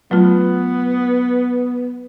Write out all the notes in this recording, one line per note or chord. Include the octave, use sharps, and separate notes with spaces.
F#3 A3 B3 F4